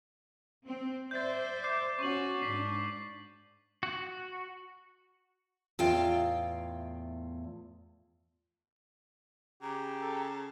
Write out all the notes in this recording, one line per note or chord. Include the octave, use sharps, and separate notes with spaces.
C4
C5 D5 E5 G6 A6
D6 G6 C7
C#4 F#4 C#6 D#7 F#7
G#2 D4 B6 C7
F#4
E2 A2 F4 F5 G5
C#3 G4 A#5
A4